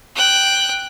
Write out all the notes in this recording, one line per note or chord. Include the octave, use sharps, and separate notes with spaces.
G5 F#6